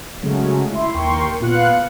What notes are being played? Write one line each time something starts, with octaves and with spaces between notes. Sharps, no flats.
C#3 F#3 G#3 A3 C#4
E4 E5 C6
D#2 A#4 G5 C6 C#6
A#2 B3 F4 F5 F#6 C#7